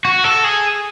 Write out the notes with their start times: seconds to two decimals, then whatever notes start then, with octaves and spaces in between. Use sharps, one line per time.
0.05 F#4
0.24 A4
0.44 G#4